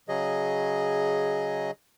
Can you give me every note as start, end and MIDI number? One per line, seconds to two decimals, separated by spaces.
0.08 1.71 49
0.08 1.71 54
0.08 1.71 68
0.08 1.71 75